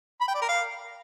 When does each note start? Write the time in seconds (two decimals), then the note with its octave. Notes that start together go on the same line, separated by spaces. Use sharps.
0.21 B5
0.28 G5
0.35 D5
0.42 A#4
0.48 F5